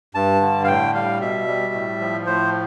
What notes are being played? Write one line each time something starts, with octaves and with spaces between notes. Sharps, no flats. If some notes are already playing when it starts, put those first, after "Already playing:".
G2 A5
D3
F5
A2 G5
G3 F5
B2 E5
G3
A2
F3
A2 C5